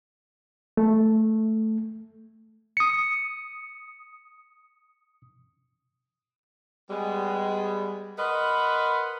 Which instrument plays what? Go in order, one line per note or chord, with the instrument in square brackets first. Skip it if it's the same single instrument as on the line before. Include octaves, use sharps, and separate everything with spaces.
[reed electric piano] A3
[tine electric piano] D#6 C#7
[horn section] G3 G#3 B3
A#4 B4 D#5 F#5 B5 C6